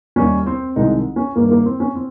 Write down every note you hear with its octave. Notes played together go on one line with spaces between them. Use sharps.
D#2 D#3 G3 C#4
C4
C2 C3 D#3 G#3 D#4
C#4
G2 D#3 G3 A#3
A#3
C4
C#4
C4